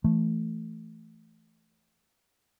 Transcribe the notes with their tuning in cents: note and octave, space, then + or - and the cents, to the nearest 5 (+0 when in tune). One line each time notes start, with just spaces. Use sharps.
E3 +15 A3 +0